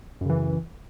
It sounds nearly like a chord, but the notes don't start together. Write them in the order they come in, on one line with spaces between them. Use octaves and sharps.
F#2 C#3 E3